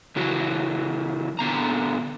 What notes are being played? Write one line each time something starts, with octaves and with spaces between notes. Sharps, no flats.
C#3 E3 F#3 F#4
A#2 D3 B3 A#5